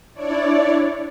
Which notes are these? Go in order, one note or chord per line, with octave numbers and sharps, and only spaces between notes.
D4 E4 C#5 D5